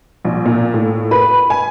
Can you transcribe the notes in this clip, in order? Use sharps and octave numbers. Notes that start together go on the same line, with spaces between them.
A#1
A#2
A2
B4
G#5